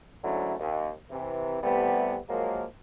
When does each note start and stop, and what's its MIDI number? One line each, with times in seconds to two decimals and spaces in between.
0.24 0.56 44
0.24 0.56 50
0.24 0.56 54
0.24 0.56 57
0.24 0.56 61
0.24 0.56 64
0.60 0.91 39
1.11 1.63 48
1.11 1.63 52
1.63 2.18 48
1.63 2.18 52
1.63 2.18 55
1.63 2.18 57
1.63 2.18 59
2.30 2.65 53
2.30 2.65 54
2.30 2.65 56
2.30 2.65 58